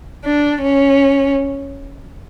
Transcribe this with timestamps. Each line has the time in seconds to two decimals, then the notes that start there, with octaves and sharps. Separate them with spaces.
0.25 D4
0.62 C#4